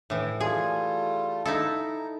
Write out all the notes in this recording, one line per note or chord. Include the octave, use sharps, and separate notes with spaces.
A2 E3
G3 A3 F4 G#4
D#4 E4 A4 F5
A#5